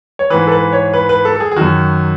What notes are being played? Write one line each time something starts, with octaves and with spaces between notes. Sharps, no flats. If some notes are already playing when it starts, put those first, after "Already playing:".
C#5
G#2 E3 B4
A4
B4
C#5
B4
B4
A4
A4
G#4
G#4
F#2 D#3 F#4